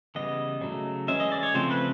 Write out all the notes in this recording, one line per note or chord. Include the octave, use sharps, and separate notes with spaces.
C#3 E3 G3 B3 D#5
C#3 F#3 A3
E3 G#3 C#4 E5
D#5
D5
C#5
C#3 F3 A3 C4 C5
B4